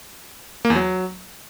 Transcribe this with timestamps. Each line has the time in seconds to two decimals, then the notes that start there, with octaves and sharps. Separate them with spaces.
0.65 A#3
0.70 E2
0.75 F#3